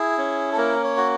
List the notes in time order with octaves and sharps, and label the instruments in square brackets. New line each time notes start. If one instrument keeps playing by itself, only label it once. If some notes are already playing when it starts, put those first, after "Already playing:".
Already playing: [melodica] E4 G#4
C#4
A4
A#3 A#4
C#5
F#4